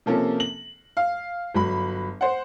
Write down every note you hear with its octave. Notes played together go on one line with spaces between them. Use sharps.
C3 F3 A#3 C#4 A4
F#7
F5
G1 F#3 B5
C5 F#5